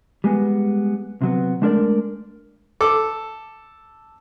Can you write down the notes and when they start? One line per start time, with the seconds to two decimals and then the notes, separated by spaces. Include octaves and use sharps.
0.24 G3 G#3 B3
1.22 C3 F#3 B3
1.62 G#3 A3 D4 A#4 C#5 D5
2.81 A4 D6